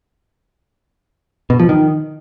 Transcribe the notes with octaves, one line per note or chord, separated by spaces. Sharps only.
B2
F3
D#3